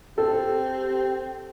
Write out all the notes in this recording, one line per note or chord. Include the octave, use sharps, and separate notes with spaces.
C4 G4 A4